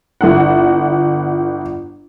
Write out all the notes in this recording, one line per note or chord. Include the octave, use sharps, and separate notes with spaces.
G1 E4 F#5